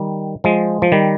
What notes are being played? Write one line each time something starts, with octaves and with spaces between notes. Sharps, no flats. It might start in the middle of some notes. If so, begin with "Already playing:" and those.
Already playing: D#3 G3
F3 G#3
F3
D#3 G3